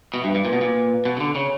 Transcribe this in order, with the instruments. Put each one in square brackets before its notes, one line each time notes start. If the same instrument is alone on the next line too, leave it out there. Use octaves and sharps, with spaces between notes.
[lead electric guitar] B2 [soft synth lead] E5
[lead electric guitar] G2
[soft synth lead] B4
[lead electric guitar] G2
[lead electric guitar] A#2 [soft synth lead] B4
[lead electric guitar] B2
A#2
B2
C#3
D3
[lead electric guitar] C#3 [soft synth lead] C#5